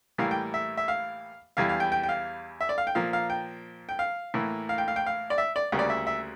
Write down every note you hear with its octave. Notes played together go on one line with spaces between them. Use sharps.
A2 E3 G3 A#3 F5
G5
E5
E5
F5
E2 E3 G3 F5
F5
G5
G5
G5
F5
E5
D5
F5
G5
A#2 F3 A#3 F5
F5
G5
G5
F5
A2 E3 A#3
F5
G5
F5
G5
F5
D5
E5
D5
D2 C#3 G3 A#3
D5
E5
E5